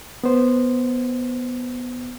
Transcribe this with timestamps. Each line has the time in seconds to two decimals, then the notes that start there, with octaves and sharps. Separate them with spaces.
0.24 B3 C5